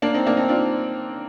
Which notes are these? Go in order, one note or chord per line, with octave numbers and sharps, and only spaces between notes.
A#3 D4
C4 D#4
A#3 D4
C4 D#4
D4 F4